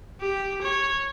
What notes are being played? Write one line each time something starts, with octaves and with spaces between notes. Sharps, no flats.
G4
C#5